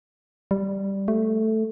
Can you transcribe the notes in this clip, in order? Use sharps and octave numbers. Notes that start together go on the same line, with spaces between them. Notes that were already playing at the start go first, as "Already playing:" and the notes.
G3
A3